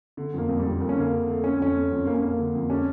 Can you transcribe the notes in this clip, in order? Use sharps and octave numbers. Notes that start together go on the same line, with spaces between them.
D3
F2 A#3
F2
G3
F2
F2 A#3
C#4
D3 A#3
D3
A3
A3 C#4
F2 C#4
A3
F2
F2 A#3
C#4
A3 A#3
D3
F2
C#4 D4